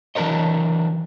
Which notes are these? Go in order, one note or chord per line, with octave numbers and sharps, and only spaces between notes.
E3 F#3 D4 A#4 C#5 D#5